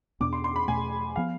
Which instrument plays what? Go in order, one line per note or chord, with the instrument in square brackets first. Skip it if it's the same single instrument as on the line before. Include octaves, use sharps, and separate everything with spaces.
[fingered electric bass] E2 B2 B3 D4 [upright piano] D6
[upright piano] C6
C6
B5
[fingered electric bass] E2 B2 A3 [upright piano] G#5
[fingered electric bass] F3 B3 [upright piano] F5